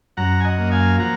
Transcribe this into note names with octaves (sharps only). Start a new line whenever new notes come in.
F#2 F#5 A#5
G#5
D#5 F#5
A#3
F5 G#5
F3 F#5 A#5